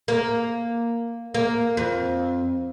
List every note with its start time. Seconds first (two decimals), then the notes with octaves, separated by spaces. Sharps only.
0.08 A#3
1.35 A#3
1.77 F2